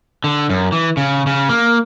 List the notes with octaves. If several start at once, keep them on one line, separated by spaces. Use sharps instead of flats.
D3
F#2
E3
C#3
C#3
A#3